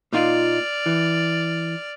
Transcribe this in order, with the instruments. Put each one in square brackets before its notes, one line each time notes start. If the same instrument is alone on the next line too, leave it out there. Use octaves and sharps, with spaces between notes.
[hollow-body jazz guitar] A#2 D#4 F4 [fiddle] D5 F6
[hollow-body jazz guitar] E3